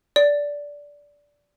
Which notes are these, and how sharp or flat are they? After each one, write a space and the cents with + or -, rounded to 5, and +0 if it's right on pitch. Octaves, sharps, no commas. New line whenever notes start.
D5 -15